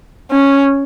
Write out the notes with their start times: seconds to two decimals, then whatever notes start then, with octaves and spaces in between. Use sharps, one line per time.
0.31 C#4